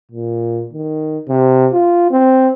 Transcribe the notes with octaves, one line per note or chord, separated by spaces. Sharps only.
A#2
D#3
C3
F4
C4